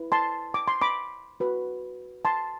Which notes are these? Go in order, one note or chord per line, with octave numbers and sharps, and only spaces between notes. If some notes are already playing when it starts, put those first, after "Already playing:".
Already playing: E4 B4
A5 C6
D6
C6
B5 D6
F#4 B4
A5 C6